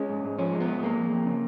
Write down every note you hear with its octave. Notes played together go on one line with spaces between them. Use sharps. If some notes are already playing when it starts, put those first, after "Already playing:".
Already playing: G#3 C#4
G#2
G#2
F3 C#4
G#3
B3
G#2
G#3 A#3
F2
F2
C#3